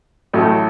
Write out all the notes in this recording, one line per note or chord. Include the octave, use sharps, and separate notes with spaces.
A1 A2 F#3 A3